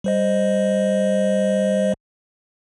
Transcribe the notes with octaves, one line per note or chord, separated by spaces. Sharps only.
G3 C5 D#5